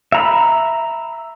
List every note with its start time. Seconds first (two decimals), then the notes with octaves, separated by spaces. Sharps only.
0.12 E5 A#5 B5